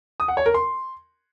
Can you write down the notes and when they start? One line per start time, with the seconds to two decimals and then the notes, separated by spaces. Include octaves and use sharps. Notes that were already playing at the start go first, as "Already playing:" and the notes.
0.20 D#6
0.28 F#5
0.37 C#5
0.46 A#4
0.54 C6